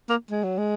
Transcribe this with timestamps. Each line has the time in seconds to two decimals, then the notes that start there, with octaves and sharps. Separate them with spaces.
0.09 A#3
0.31 G#3
0.44 F#3
0.58 G#3